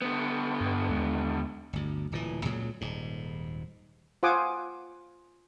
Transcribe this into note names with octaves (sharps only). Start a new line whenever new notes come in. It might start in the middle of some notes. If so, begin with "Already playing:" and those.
D3 B3
G2
D#2 G#3
G1 D2
D1 A#2 E3
C#2 A#2 C#3 F#3
D#1 G#2
F4 C5 F#5 G#5 D6 D#6